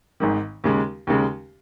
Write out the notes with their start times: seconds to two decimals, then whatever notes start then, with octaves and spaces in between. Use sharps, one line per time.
0.20 G#1 G#2 D#3
0.64 D#2 C#3 G#3
1.07 D#2 C#3 G#3